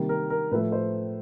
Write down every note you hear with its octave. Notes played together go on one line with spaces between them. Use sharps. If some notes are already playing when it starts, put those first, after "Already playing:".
Already playing: C3 D#3 G3 A#3
A#4
A#4
A2 F3 A3 B4
C5